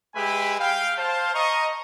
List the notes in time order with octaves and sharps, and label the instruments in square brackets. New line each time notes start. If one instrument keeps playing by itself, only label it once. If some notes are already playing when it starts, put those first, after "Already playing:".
[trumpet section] G#3 G4 B4 E5 G#5 B5
F5 G5
C5 F5 A5
D#5 A#5 C#6